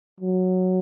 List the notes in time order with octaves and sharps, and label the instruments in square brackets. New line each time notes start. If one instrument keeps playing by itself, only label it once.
[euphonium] F#3